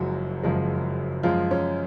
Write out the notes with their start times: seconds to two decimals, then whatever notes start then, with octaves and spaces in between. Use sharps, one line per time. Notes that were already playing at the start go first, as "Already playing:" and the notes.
Already playing: F#1 F#2 F3 F#3 G#3 F#4
0.43 F#1 F#2 F3 G#3
1.23 F#2 F3 G#3 F4
1.51 C#4